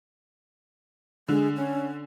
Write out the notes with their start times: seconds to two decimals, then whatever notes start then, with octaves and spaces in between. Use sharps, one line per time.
1.28 D3 G#3
1.56 C#4